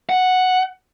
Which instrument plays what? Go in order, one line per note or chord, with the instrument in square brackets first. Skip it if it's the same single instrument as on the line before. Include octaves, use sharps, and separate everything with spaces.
[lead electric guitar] F#5